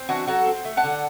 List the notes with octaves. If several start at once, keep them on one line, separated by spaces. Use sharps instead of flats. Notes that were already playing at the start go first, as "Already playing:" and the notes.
Already playing: C4
E3 D4 F#4
F#3 F#4 A4
C4
A3
F#5 A5
D3